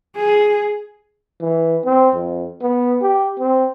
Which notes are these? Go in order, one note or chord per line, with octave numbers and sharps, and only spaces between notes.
G#4
E3
C4
F2
B3
G4
C4